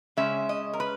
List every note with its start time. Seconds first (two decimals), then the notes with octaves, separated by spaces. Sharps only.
0.17 C#3 G#3 C#4 E5
0.49 D#5
0.73 A#4
0.80 B4